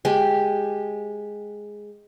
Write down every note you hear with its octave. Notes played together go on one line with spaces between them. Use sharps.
G#3 G4